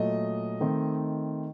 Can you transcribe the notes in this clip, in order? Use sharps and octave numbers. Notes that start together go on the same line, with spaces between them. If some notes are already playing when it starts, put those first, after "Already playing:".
Already playing: A#2 F#3 A3 D#5
D#3 A3 C4 D#4